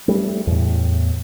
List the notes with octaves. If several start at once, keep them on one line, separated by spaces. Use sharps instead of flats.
G3 A3
E2 A2